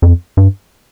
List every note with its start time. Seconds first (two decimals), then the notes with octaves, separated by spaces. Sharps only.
0.02 F2
0.37 G2